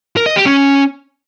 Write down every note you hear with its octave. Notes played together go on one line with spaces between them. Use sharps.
A#4
D#5
G4
C#4